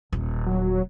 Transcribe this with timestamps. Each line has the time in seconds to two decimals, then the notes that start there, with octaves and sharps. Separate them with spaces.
0.12 D#1
0.46 F#3